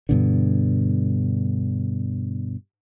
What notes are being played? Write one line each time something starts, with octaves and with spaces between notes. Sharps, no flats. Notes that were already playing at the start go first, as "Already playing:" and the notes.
G2 B2 D3